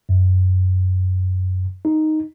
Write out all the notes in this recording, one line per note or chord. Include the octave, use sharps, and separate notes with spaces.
F#2
D#4